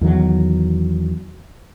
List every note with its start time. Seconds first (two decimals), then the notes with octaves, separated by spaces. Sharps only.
0.01 E2 D#3 F#3